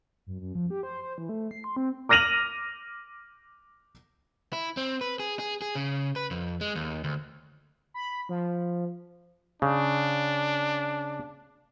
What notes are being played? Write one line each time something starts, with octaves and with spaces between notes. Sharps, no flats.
F#2
F#2
F3
G4
C5
C5
E3
A3
C7
C6
C4
D6 F6 A#6 D#7 F7 F#7
E4
C4
B4
G#4
G#4
G#4
C#3
B4
F2
G#3
D#2
D2
B5
F3
C#3 D4